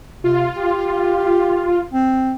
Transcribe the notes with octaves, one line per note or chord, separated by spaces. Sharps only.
C3 F4
G4
C4